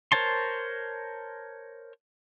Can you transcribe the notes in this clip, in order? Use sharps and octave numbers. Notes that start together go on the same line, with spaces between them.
A#4 C5 C#5 A5 C6